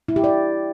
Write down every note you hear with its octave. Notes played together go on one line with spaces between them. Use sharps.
E4
G4
D5